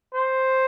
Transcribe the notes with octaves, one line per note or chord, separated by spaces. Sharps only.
C5